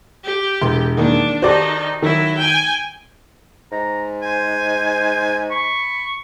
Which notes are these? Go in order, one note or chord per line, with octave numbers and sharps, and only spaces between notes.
G4
E1 C6
D#3 A#3 D4 D#4
D#3 D#4 F#4 G4 A4 C5 D5
D#3 F#3 E4
G5 G#5
G#2 A#5
C5 G#5
B5 C#6